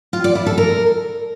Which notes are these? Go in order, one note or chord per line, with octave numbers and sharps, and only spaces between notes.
F4
D5
E4
A4
A#4